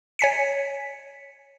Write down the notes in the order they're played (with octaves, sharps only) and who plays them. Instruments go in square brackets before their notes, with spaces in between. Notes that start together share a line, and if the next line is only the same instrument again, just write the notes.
[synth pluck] C#5 G#5 B6 C#7